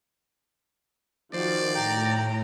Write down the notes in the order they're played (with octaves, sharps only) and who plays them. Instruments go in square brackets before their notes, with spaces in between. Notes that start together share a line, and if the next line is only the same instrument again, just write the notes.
[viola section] D#3 F3 F#4 [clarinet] C5 [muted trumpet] D5
[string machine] A2 [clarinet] G5 [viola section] A#5